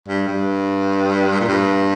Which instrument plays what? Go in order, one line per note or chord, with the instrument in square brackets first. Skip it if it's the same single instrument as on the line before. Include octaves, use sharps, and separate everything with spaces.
[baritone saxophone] G2
G2
A#2
G2